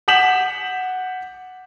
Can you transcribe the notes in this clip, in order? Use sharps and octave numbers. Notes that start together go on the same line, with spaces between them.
F#5 G6 B6 E7 F#7